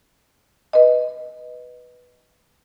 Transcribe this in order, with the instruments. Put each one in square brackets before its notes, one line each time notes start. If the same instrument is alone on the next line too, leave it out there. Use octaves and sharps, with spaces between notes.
[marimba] B4 D#5